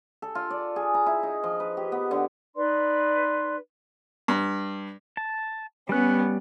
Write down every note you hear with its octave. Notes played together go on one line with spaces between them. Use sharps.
A4
F4
D5
G#4
A#5
E4
D#4
F3
B4
G4
B3
D3
D#4 B4 D5 C6
G2
A5
G3 B3 C#4 F#6